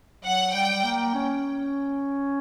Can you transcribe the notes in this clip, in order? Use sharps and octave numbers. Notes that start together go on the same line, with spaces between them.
F#3 F#5
G3 G5
A#3
C#4